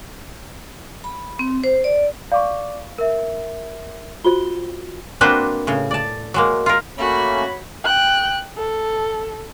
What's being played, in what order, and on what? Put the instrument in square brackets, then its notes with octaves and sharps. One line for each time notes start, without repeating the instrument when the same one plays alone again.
[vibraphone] B5
C4
C5
D5
[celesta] D5 D6 [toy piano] F5 C#6
[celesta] A#4 E5
[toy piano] F4 F#4 C5 [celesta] G7
[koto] A#3 C4 D4 F#4 B4 C5
A2 C#3
D5 A5
F#3 G#3 A#3
F4 A#4
[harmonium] A3 A#3 C#4 [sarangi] F#4 [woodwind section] C#5 B5
[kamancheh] G5 F#6
A4